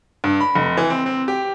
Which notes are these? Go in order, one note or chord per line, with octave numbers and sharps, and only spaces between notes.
G2
B5
F1
E3
C4
C4
G4